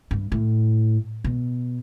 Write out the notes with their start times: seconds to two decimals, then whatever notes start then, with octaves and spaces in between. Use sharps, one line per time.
0.11 G2
0.32 A2
1.24 B2